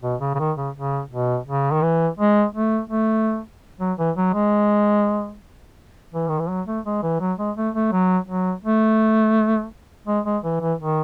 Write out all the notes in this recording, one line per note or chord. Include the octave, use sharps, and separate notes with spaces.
B2
C#3
C#3
D#3
C#3
C#3
B2
C#3
D#3
E3
G#3
A3
A3
F#3
E3
F#3
G#3
E3
D#3
E3
F#3
A3
G#3
E3
F#3
G#3
A3
A3
F#3
F#3
A3
G#3
G#3
E3
E3
D#3